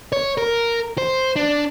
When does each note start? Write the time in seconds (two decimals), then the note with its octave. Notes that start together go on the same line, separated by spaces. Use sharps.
0.12 C#5
0.38 A#4
0.98 C5
1.36 D4